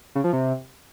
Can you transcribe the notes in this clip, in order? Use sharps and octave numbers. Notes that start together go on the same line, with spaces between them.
C#3
F3
C3